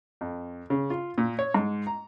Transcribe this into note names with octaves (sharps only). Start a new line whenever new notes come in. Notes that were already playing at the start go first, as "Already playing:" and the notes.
F2
C#3
F4
A#2
C#5
G#2
A#5